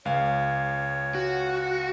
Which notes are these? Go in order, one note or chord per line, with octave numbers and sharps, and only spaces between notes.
C#2 C#5 F5
F#4